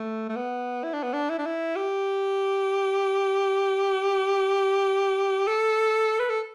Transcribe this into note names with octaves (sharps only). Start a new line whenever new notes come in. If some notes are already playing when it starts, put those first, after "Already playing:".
Already playing: A3
A3
B3
E4
D4
B3
D4
E4
D4
E4
G4
A4
B4
A4